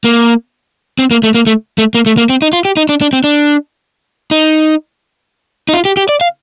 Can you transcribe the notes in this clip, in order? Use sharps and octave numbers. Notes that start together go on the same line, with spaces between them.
A#3
C4
A#3
A3
A#3
A3
A3
A#3
A3
A#3
C4
D#4
F4
G4
D#4
D4
D4
C4
D4
D#4
D#4
F4
G4
G4
D5
F5